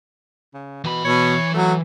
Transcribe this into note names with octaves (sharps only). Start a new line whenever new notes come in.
C#3
B2 E3 B5
B2 C#5
F#3 A3